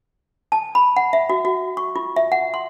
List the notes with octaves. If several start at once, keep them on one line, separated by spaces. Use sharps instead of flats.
A5
B5
F#5
E5
F#4
F#4
C#6
F4
E5
F#5
C6